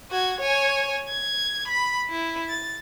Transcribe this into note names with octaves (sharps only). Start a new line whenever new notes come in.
F#4 G#6
C#5 G#5
G#6
B5
E4
A6